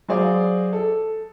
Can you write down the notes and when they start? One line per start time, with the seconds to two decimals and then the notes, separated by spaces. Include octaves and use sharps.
0.08 F#3 F#4 G#4 C5 D5 F5
0.73 A4